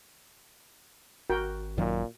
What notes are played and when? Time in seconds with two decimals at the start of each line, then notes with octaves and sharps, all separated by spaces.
1.30 G#1 F#4 A#4 G5
1.78 F#2 A#2 D#3 F#3